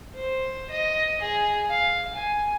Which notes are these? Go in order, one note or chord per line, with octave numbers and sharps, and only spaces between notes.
C5
D#5
G#4
F5
G#5